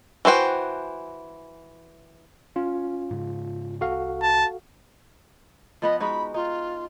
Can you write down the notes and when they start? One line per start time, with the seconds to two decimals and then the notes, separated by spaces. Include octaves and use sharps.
0.25 E3 F#4 C5 G5
2.56 C#4 F4
3.11 G#2 C#3
3.81 C2 F#4 A4 F5
4.22 A5
5.82 F3 B3 B4 D#5
6.00 G#3 D#4 F#4 B5
6.34 D#4 F4